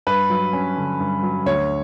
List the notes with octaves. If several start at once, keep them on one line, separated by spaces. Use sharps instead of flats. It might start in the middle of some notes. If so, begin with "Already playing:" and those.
G2 B4
F#3
C#4
D3
G2
F#3
D2 C#5